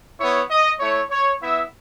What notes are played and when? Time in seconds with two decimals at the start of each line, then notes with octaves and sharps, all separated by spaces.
0.19 B3 E4 C#5
0.50 D#5
0.80 A3 E4 C#5
1.11 C#5
1.40 B3 E4 E5